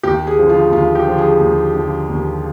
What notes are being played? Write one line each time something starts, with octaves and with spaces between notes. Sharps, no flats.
D#2 G4
G#4
D3 F3
F4
D#2 F4
G4
D3 F3
G#4
D#2
D3 F3
D#2